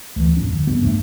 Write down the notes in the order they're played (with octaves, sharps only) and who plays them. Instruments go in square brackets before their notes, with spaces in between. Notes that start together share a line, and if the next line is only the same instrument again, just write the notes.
[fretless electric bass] D2 E3
D#1 A1 F2 C#4
D3
E2 G2 C#3 B3
A#1 G2 E3 A3